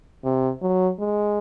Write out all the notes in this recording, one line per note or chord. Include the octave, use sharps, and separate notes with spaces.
C3
F#3
G#3